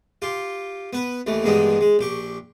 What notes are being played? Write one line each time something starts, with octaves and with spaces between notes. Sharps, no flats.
F4 G4
B3 B4
D#2 E3 A3
A1 G2 D#3 G#3 B3 D#4
G#3
A#1 G4 C#6